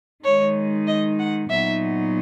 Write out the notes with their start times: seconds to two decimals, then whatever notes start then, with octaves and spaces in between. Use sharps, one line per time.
0.25 D#3 G#3 D#4 C#5
0.88 D#5
1.20 F#5
1.50 A#2 F#3 B3 D#4 E5